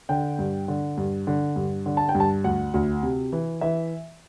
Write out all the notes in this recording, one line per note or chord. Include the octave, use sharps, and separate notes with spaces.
D3 G5
G2
D3
G2
D3
G2
D3
A5
G5
G2
A5
D2 F#5
D2
C3
E3
E3 E5